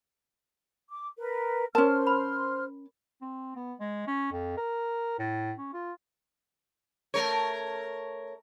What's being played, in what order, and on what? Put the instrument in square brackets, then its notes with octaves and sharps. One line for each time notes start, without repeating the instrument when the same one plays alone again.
[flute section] D6
A#4 B4
[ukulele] C#4 A5 [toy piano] A#4 [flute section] C5 C6 F6
[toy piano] B5
[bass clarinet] C4
B3
G#3
C#4
F2
A#4
A2
C#4
F4
[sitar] A3 A#4 C#5